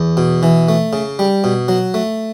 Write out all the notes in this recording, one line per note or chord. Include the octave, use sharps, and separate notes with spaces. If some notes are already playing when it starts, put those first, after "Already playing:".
Already playing: E2
B2
E3
A3
C#3
G3
B2
F#3
A3